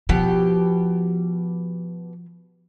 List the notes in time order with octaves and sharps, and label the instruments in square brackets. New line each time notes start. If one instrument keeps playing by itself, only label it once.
[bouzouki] B2 G4 [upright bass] F3